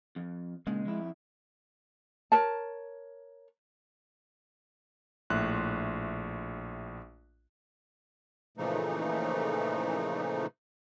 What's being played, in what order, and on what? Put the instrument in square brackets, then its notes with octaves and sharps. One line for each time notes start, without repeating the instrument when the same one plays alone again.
[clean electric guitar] F2
[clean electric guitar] A#2 C#3 [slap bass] G#3
[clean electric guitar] F2 E4
[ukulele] A#4 C#5 A5
[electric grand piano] A#1 A2 E5 C6 F#6
[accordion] A#2 C#3 E3 F3 A3 D#4